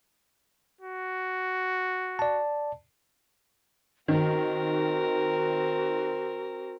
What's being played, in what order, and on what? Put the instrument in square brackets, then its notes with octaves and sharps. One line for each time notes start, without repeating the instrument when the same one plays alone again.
[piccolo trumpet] F#4
[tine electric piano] D5 A5
[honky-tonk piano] D#3 [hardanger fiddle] C4 A#4 [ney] F#4